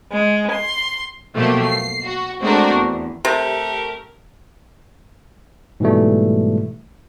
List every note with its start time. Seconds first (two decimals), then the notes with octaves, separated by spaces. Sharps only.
0.12 G#3
0.52 C6
1.35 B2 F3 F#3 A3 A#3 G4
1.67 C7
2.06 F#4
2.41 G#3 A3 C4 D4 F#4 A#4
2.73 E2
3.25 C3 A3 G4 A#4
5.80 G#2 B2 E3 G3 A3